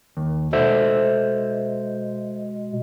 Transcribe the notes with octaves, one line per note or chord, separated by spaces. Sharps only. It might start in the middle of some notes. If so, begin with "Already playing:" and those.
D#2
B2 G#3 A4 C5 E5